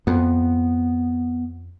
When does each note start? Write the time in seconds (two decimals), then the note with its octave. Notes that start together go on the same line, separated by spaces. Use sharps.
0.07 F2 B3